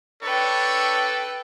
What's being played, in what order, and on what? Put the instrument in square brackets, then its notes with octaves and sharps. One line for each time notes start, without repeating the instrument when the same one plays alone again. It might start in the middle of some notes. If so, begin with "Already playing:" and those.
[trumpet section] D4 C#5 [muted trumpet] A4 [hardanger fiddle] B4 G5